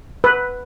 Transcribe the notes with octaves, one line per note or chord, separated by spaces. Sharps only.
B4